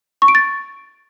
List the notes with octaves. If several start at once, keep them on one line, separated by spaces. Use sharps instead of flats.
C#6
D7
A6